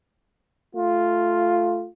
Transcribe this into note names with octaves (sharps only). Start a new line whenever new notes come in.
A3 F4